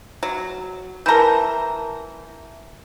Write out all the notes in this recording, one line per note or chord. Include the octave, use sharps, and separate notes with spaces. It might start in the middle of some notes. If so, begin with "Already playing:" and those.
F#3
E3 A#4 A5 A#5 G6